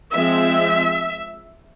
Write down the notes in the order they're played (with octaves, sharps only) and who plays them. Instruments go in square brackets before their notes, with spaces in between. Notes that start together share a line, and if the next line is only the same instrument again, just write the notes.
[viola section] F3 G#3 C4 E5